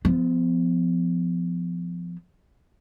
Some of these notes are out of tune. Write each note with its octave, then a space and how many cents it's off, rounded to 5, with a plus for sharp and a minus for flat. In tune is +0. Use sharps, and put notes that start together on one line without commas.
F3 -5 B3 +35